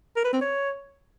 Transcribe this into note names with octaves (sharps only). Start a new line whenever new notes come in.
A#4
B4
C4
C#5